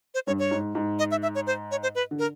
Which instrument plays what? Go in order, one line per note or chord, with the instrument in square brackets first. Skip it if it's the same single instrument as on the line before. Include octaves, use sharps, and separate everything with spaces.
[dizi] C5
[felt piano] G2 [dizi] C#5
[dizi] C#5
[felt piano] G#2
G#2
[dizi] D#5
E5
E5
C#5
C5
C#5
C5
B4
[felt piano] D3
[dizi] A#4